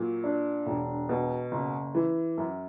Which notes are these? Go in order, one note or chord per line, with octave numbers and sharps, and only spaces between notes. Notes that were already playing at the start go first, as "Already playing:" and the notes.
Already playing: A#2 F#3
D4
E1
B2
F#1
E3
F#2